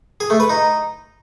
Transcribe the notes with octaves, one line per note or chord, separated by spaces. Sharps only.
G#4
A3
B4
D#4